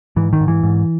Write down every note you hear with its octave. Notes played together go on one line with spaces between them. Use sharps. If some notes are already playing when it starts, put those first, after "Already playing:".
G#2 E3
D#3
G#2
E3
G#2